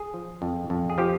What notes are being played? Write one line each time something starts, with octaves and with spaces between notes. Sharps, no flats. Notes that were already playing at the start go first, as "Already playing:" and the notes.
Already playing: G#4
F3
F2
F2
G#4
F3 G4